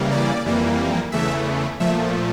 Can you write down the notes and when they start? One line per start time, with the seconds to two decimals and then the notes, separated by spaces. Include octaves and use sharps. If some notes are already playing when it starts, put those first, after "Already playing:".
Already playing: C#3 E3 G3 A#3
0.12 D5
0.45 F2 E3 G3 A#3
1.12 E2 C#3 E3 A3 E5
1.80 A#2 F3 A3 E5